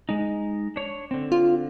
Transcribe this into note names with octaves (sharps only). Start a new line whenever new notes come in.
G#3 D#4
D4 C#5
D3 C4
F4